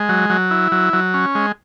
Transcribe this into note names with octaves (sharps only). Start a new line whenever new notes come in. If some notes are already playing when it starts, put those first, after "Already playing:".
Already playing: G#3
F#3
F#3
E4
F#3
F#3
C#4
G#3